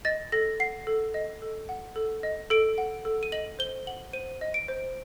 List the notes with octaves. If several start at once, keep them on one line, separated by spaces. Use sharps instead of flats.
D#5 A6
A4 A#6
F#5 C7
A4
D#5
A4
F#5
A4
D#5
A4 D7
F#5
A4
D#7
D#5 F#7
C5 G7
F#5 F#7
C5 D#7
D#5
D7
C5